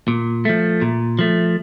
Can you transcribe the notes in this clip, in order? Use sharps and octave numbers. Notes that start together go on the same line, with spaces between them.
A#2
F3 A3
A#2
F3 A3